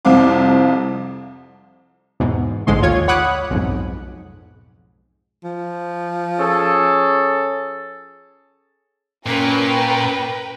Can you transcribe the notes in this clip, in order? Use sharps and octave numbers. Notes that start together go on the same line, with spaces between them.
C2 F2 C5 F5 D6
E2 G#2 B2
A#1 G#2 D3 G#3 C6
D#2 F4 C#5 G#6
C#5 F#5 B5 D6 D#6 F#6
B1 F2 G#2
F3
C#4 G#4 A4
A#2 C#4 A#4 B4 G5